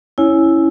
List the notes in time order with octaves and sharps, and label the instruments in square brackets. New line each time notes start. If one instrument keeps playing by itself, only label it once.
[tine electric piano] C#4 [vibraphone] E4